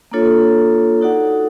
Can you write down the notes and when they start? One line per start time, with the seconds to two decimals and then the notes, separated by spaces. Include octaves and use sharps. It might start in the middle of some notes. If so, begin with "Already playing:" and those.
0.12 A#3 D4 F4 A4 C#5
1.01 D#4 F#4 A4 D5 F#5